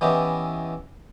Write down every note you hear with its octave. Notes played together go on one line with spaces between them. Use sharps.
E3 B3 C#4 E4 G4 D#5